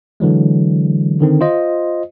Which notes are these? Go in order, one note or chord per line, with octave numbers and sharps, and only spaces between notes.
D3 E3 F#3 G#3
D3 D#3 C4
F4 C5 D#5